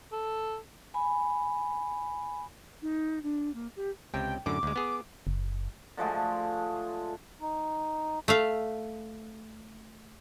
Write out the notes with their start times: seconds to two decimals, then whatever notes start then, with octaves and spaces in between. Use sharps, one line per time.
0.12 A4
0.94 G#5 B5
2.82 D#4
3.23 D4
3.53 A#3
3.76 G4
4.14 C#2 C3 G5
4.46 F#2 A2 D3 D6
4.63 D2 G#3
4.76 B3 G#4
5.27 F#1
5.97 D3 F3 G#3 A3
7.41 D#4
8.28 A3 E5 F5